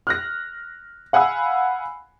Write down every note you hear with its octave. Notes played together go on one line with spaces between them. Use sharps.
F6 F#6 A#6
F5 F#5 G#5 B5 E6